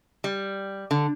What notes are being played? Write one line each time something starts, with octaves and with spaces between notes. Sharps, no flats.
G3
D3